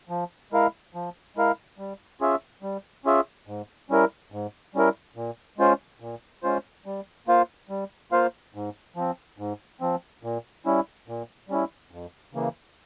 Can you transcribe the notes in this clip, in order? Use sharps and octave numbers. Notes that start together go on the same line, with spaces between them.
F3
G#3 E4 A#4 F5
F3
G#3 E4 A#4 F5
G3
C#4 F4 G#4 E5
G3
C#4 F4 G#4 E5
G#2
G3 C#4 E4 A#4
G#2
G3 C#4 E4 A#4
A#2
G#3 C#4 F4 C5
A#2
G#3 C#4 F4 C5
G3
A#3 F4 C5 F5
G3
A#3 F4 C5 F5
G#2
F3 C4
G#2
F3 C4
A#2
G3 C#4 E4
A#2
G3 C#4 E4
F2
C#3 E3 A#3